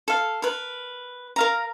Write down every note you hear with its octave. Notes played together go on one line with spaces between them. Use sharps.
A4 F5
A#4 B4
A#4 F5 A#5